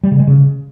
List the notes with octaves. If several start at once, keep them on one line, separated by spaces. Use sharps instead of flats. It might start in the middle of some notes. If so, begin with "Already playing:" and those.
G3
C#3
G#3
C#3